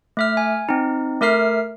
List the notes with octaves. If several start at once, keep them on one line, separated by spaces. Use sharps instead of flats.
A3 E5 F6
G#5
C4 D#4
A3 A#4 E5 F6 C7